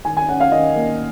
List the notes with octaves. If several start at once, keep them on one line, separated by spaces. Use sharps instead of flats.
D#3 G#5
G#5
C#4 F#5
F5
D#3 D#5
A#3